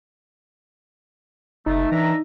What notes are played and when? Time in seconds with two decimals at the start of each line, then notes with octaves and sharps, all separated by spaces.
1.66 F#1 A3 D#4
1.91 E3 D4 E5 A#5